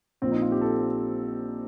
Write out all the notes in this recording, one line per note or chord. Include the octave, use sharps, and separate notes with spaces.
A#1 A#2 F3 C4
D#4
F4
G4
A4